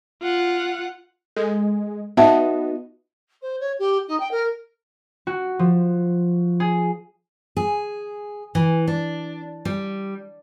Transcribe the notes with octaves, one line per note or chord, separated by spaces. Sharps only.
F4 F#5
G#3 A4
B3 D#4 F#4 E5 A5
C5
C#5
G4
D#4
G5
A#4
F#4
F3
G#4
G#4
E3
D4
G3